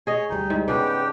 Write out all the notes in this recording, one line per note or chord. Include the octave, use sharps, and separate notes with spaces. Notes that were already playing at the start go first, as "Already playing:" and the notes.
G#4 C#5 D#5
D2 G3 D#4
G#2
C#3 B3 D4 G4 G#4 G5